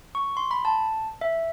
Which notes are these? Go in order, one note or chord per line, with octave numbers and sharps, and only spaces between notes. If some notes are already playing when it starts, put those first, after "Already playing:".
C#6
C6
B5
A5
E5